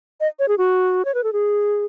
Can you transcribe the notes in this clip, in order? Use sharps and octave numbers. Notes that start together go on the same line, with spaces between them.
D#5
C#5
G#4
F#4
C#5
B4
A4
G#4